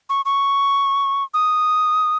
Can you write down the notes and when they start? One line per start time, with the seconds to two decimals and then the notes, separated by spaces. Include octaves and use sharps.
0.10 C#6
0.25 C#6
1.34 D#6